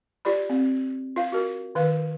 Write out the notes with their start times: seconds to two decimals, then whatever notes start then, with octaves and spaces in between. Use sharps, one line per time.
0.25 F4 G4 D5 B5
0.50 C4
1.16 F4 F5
1.32 F#4 A#4
1.75 D#3 B4 F5